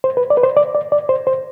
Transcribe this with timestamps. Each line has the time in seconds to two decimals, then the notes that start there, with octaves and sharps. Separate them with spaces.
0.04 C5
0.17 B4
0.30 D5
0.37 B4
0.43 C5
0.57 D5
0.75 D5
0.92 D5
1.09 C5
1.27 C5